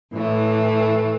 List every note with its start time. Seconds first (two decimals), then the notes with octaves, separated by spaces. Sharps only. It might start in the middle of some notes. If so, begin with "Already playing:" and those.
0.12 A2 E3 A3